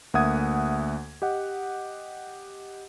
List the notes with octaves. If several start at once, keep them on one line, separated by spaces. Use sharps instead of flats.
D2 A#3 E5 F#5 D#6 G#6
G4 D#5 F#5